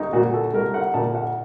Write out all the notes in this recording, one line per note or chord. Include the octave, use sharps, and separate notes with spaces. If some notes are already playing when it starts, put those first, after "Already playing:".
Already playing: C2 D#4
A#2 F#4
A4
C2 A#4
F#5
A#2 A5
F#5